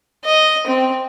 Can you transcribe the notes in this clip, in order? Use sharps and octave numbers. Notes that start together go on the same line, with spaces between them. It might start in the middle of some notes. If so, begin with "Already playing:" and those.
D#5
C4